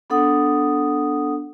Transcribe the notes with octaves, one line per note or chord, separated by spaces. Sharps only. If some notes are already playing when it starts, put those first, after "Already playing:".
B3 D4 A4 F#5 D#6